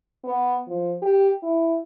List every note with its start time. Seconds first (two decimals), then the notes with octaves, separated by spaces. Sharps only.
0.24 B3
0.68 F3
1.02 G4
1.43 E4